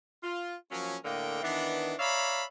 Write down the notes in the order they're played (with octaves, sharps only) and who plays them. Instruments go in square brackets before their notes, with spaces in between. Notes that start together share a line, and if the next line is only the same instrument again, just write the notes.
[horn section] F4
F3 F#3 A#3 C#4
A2 D3 A#3 A#4 D#5 G5
D#3 E3 B3 D4
C#5 D5 E5 F5 A#5 B5